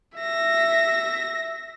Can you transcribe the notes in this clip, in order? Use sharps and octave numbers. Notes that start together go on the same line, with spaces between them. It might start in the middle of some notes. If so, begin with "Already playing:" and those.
E5 A#6